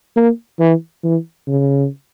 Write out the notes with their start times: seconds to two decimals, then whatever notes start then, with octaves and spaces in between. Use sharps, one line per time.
0.16 A#3
0.60 E3
1.04 E3
1.47 C#3